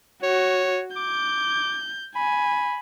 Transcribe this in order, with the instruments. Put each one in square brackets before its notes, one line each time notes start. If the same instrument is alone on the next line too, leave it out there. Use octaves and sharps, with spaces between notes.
[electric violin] F#4 [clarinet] C#5
[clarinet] D6 [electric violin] G6
[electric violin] G#5 [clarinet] B5